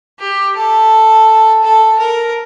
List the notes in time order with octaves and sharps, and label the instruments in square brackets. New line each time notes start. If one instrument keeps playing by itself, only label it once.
[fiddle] G4
A4
A4
A#4